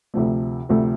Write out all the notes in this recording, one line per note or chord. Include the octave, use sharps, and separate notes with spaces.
D2 C3 F3 A3
D2 C3 F3 A3